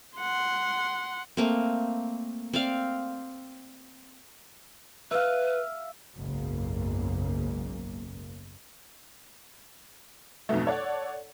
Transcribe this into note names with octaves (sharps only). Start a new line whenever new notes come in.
F#5 C6
A3 A#3 C4
C4 D5 F5
B4 E5 F5
F#1 B1 G#2 C#3 A#3
B1 F2 G#2 B2 A3
A4 C#5 D5 F#5